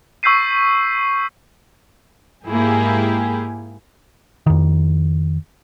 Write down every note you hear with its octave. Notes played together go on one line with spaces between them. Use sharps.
C#6 E6 G6 B6 C7 D#7
G#2 A#3 E4 G4 G#4
F2 D#3